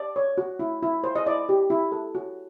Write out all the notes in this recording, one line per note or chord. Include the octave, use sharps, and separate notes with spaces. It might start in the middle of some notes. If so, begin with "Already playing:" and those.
Already playing: D5
C#5
F#4
E4
E4
C5
D#5
E4 D5
G4
E4
A4
F#4